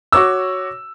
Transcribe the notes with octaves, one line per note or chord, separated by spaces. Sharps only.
F#4 C#5 D6 E6